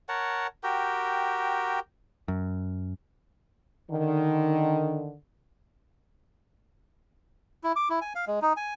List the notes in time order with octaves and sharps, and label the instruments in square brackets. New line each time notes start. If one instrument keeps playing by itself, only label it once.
[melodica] A#4 C#5 F#5 A5
F#4 G4 A#4 G5
[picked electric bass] F#2
[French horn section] D3 D#3
[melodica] E4
D6
E4
G#5
F5
G#3
D#4
G#5